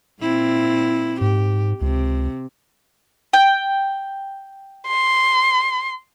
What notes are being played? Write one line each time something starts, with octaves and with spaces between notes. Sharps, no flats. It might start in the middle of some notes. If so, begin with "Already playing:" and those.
A#2 C4 E4
G#2 G4
C#2 C3
G5
C6